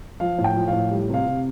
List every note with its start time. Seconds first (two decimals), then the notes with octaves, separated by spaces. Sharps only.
0.20 F3 F5
0.38 A2
0.44 G5
0.56 F3
0.68 F5
0.73 A2
0.91 G3
1.09 C3 F5
1.26 C3